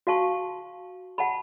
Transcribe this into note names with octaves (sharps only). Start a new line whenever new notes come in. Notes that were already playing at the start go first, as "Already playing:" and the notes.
F#4 F5 A5 C#6
F#5 A5 B5